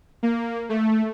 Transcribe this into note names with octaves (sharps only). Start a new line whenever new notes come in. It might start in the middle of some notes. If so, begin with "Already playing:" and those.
A#3
A3